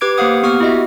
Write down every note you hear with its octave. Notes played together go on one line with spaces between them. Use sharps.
G4 B4 D6 G#6 D7
A#3 G4 C5 F5 F#5 D#6
B3 G4 C#6 D#6 F6
E4 F#4 D#5 E5